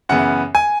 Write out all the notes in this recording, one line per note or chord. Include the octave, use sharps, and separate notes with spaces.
F#2 C#3 E3 B3 F#5
G#5